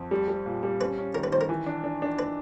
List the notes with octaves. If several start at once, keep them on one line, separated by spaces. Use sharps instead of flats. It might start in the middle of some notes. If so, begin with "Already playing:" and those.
Already playing: F2
G3
G3
A#2
G3
C#4 B4
C#4
D#3 A#4
B4
D#3 C5
A#4
E3
D4
D4
D4
B4